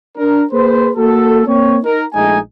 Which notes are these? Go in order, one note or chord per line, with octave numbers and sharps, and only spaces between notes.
D4 A#4
A#3 G#4 B4 C5
A#3 F#4 A4
A#3 C4 C#5
D#4 A#4
A#1 G#3 A3 D#4 G#5